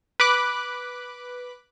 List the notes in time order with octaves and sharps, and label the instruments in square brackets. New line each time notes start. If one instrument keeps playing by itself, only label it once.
[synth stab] B4 B5 D6 F#6